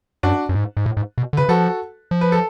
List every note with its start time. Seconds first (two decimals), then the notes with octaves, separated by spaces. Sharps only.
0.23 F#2 D4 F#4
0.49 F#2
0.55 G#2
0.77 G#2
0.86 A2
0.97 G#2
1.18 B2
1.33 D3
1.37 C#3 B4
1.49 F3 F#4 A4
2.11 F3
2.21 B4
2.32 A4